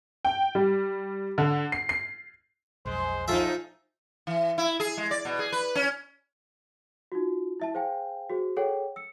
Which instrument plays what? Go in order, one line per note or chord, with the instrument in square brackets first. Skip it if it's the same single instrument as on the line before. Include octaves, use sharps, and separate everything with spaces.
[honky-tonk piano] G5
G3
D3
C7
C7
[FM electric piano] B1 F2 [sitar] G#3 [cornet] C5
[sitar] F3 D#4 [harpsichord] F4 E5 [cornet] A4
[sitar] E3
E4
G#4
G#3
D5
B2
G#4
B4
C#4
[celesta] D#4 F4 F#4
E4 E5 A5
G#4 C5 F5 G5 G#5
F#4 G#4 C5
G#4 A4 C#5 F#5 G5
E6 C#7